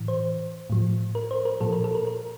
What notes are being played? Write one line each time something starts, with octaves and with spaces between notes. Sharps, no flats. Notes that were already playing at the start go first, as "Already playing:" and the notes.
Already playing: A2 E3
C5
A2 F3
A#4
C5
A#4
A#2 F3 A4
A#4
A4
A#4
A#4